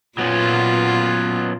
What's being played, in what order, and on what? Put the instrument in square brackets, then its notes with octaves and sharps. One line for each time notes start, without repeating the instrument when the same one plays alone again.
[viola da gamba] A#2 F4 [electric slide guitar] F#3 B3 C#4